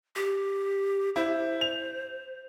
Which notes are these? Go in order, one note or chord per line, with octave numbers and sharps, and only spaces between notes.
G4
E4 C5
F7